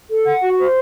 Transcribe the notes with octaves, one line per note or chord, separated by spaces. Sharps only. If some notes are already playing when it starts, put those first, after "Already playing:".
A4
F#5
F#4
C5